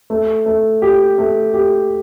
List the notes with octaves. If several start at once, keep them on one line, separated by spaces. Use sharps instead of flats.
A3
A3
G4
A3
G4